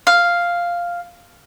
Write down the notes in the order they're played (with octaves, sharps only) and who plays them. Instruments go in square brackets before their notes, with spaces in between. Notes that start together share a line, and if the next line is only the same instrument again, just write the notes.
[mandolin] F5